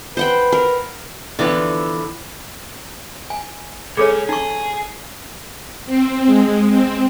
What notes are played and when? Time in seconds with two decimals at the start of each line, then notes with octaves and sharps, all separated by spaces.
0.17 B4 C5 F#5 G5
0.52 A#4
1.39 D3 E3 F3 B3
3.30 G#5
3.97 C#2 C#4 G#4 A4 C#5
4.29 D#4 G#4 C#6
5.86 C4
6.26 G#3
6.69 C4